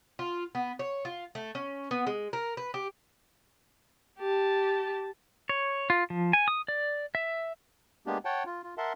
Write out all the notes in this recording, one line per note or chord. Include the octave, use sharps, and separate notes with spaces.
F4
B3
C#5
F4
A3
C#4
B3
G#3
A#4
B4
G4
G4 A5
C#5
F4
F3
G#5
D#6
D5
E5
G#3 A#3 B3 D4 G4
C#5 F#5 G5 A5
F4
F4
A#4 E5 F#5 A5 C6